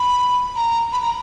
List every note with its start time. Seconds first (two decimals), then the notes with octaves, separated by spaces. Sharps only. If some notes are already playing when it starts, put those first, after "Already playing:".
Already playing: B5
0.56 A#5
0.92 B5
1.02 A#5